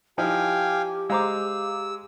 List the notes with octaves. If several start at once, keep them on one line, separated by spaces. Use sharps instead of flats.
F3 D#4 E4 G4 F5 G5 G#5
G#3 C5 F5 A#5 D6 E6